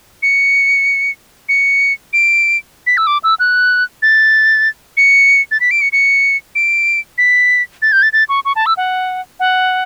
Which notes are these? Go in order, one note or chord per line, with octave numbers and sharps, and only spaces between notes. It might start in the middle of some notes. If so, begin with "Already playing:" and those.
C#7
C#7
D7
B6
E6
D6
E6
F#6
A6
C#7
A6
B6
D7
C#7
C#7
D7
B6
A6
G6
A6
A6
C#6
C#6
A5
E6
F#5
F#5